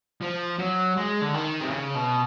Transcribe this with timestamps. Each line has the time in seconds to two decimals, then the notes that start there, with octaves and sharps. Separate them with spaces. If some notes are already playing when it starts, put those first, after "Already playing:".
0.21 F3
0.59 F#3
0.97 G#3
1.21 D3
1.34 D#3
1.61 C3
1.70 C#3
1.95 B2